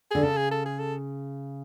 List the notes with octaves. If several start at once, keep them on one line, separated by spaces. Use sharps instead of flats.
D3 G#4
C#3 A4
G#4
A4
G#4
A4